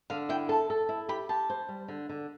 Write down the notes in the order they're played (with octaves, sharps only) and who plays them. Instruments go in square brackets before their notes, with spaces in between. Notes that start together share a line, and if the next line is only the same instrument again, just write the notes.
[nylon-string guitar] D3 [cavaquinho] F5
[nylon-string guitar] E4 [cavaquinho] G5
[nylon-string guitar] A4 [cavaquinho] A5
[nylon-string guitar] A4
E4
[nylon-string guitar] G4 [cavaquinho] B5
[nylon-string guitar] G4 [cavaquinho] A5
[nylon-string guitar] C5
G3
D3
D3